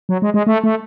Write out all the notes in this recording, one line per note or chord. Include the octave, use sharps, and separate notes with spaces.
F#3
G#3
G#3
A3
A3